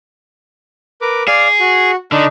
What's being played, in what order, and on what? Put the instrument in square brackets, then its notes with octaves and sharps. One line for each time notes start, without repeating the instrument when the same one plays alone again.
[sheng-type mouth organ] A#4 B4 D6
[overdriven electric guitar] G#4 [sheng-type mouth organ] D5 F5
[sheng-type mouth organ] F#4
[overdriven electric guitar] D3 [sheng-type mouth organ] D4 D#4